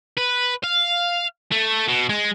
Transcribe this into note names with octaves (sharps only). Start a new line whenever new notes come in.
B4
F5
A3
B2
G#3